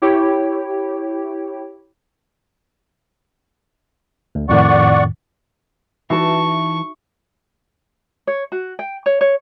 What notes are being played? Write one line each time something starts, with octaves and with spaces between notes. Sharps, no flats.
E4 G4 C#5 G5
D2
F2 A2 D#3 D5 F#5 C#6
E3 D#4 F#4 E5 A5 C#6
C#5
F#4
G5
C#5
C#5